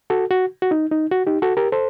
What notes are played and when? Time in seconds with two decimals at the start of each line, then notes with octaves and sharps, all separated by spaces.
0.10 F#4 A4
0.31 F#4
0.62 F#4
0.71 D#4
0.91 D#4
1.12 F#4
1.27 D#4 G4
1.42 F#4 A4
1.57 G4 A#4
1.72 A4 C5